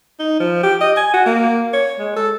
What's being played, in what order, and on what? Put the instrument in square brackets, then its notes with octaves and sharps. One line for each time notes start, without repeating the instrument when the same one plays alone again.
[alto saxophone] D#4
F3
G4
D#5
G#5
F#4
A#3
C#5
G#3
A4